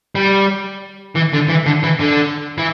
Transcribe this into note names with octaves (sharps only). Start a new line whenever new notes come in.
G3
E3
D3
E3
D3
E3
D3
E3